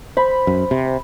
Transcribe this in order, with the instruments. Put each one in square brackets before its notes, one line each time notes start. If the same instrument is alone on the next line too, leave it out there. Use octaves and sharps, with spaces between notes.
[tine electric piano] C5 [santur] B5
[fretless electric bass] F#2
C3